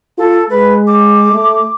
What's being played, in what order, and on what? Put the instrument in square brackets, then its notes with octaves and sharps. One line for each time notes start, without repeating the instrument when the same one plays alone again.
[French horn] F4 [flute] A4
[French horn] G#3 [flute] B4
[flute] D6
[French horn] A3